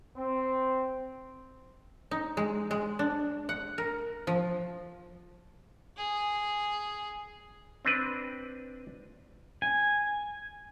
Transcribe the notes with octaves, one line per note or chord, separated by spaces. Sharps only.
C4
D#4
G#3
G#3
D4
F#5
A#4
F3
G#4
C4 D4 B4
G#5